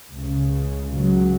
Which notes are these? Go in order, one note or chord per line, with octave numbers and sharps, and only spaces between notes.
C#2 C#3
C#3 F#3